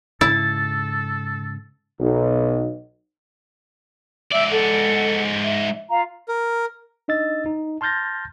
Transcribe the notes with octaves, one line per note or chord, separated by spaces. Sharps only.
G#2 C#3 E4 A4 A6
B1
G#2 D5 E5 E6
A4 F#5
E5
F4 F5 A#5
A#4
D4 D#4 D#5 E6 A6
D#4
A5 C6 F6 G6 A6 A#6